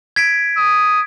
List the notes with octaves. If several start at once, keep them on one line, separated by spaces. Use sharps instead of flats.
G#6 B6 D7
D#6